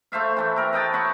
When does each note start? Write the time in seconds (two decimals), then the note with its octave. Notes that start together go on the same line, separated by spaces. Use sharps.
0.12 A3 C5 E5 F5
0.37 E3 A3 E5
0.56 G4 A#4 E5
0.73 B4 D#5 G5 A5
0.93 C#5 E5 F#5 C#6